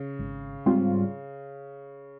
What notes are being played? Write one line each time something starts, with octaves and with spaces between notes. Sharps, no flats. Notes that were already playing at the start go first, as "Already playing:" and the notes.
Already playing: C#3
G#1
G#2 G3 C4 F4